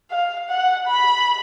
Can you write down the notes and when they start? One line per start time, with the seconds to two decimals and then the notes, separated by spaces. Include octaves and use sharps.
0.11 F5
0.50 F#5
0.88 B5